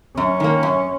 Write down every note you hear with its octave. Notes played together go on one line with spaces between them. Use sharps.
F#2 C#4
D#3 A#3
F#2